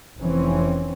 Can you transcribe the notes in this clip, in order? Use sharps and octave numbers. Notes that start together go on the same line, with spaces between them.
F1 E3 C4 C#4